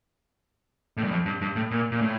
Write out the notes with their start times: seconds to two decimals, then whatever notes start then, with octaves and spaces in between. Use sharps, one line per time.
0.97 A2
1.04 G2
1.11 F2
1.26 G2
1.41 G2
1.56 A2
1.71 A#2
1.92 A#2
2.01 A2